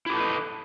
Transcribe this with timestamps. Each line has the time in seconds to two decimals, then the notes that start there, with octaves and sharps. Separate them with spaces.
0.06 E4
0.10 G4
0.13 A4
0.17 B4
0.20 D#5